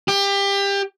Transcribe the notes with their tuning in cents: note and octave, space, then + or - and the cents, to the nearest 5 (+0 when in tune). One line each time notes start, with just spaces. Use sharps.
G4 +25